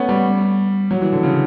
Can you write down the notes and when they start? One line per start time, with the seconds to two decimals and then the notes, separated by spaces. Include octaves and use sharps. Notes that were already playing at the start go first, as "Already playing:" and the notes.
Already playing: A3 B3 C#4
0.09 G3
0.91 F#3
1.01 E3
1.13 D3
1.23 C#3